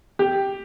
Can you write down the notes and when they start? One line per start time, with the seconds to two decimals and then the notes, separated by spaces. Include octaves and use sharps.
0.19 G4